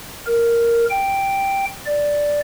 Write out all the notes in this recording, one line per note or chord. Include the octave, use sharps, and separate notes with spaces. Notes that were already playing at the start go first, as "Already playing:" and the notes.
A#4
G5
D5